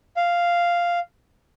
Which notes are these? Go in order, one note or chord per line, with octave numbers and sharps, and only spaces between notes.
F5